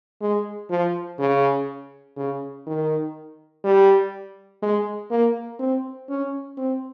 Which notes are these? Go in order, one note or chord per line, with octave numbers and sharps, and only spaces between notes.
G#3
F3
C#3
C#3
D#3
G3
G#3
A#3
C4
C#4
C4